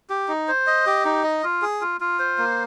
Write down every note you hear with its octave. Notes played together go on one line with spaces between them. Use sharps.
G4
D#4
C5
D#5
G4
D#4
D#5
F4
G#4
F4
F4
C5
A#3